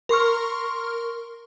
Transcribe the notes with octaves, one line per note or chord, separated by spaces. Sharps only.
A#4 C6 C#6 F6